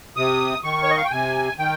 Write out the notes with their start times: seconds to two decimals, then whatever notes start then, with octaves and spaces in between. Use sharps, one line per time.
0.16 C3 D#6
0.64 D#3 C#6
0.83 C#5
0.90 D#5
0.97 F5
1.04 G5
1.11 C3 G#5
1.58 D#3 G5